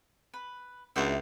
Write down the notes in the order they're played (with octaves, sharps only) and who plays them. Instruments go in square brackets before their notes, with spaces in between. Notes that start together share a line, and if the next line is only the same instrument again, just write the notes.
[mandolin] B4
[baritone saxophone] C#2 [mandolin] D4 F#4 E5